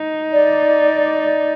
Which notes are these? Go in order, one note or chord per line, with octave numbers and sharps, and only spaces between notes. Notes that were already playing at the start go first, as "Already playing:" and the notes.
Already playing: D#4
D5